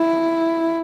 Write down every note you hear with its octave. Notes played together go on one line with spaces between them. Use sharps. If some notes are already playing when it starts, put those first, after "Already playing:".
Already playing: E4